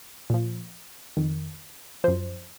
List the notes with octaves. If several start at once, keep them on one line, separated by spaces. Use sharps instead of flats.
A#2 F3
F2 D#3
F#2 F3 C5